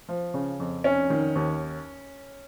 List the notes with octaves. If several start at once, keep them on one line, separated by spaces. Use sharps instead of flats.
F3
C#3
F2
F1 C#4
D#3
D#2